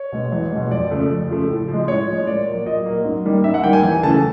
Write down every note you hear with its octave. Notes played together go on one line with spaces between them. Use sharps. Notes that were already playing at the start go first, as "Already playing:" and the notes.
Already playing: C#5
B2 G#3
E2
B2 G#3
F2 D5
C#3 F3 A3
F2
C#3 F3 A3
A2
F3
G#3
A2 C#5
F3 G#3
A#2 D5
F#3 A#3
A#2 D#5
F#3 A#3
G#2
D#3 G3 A#3
G#2 E5
F#5
D#3 G3 A#3 G5
G#5
E2 G#5
C#3 E3 A3 A5